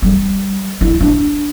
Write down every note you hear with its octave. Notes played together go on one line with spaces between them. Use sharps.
G3
E4
D4